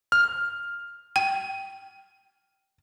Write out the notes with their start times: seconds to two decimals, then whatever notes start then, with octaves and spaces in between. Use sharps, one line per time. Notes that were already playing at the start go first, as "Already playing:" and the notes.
0.12 F6
1.16 G5